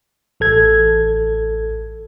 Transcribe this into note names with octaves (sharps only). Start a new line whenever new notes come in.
A1 A4 G#6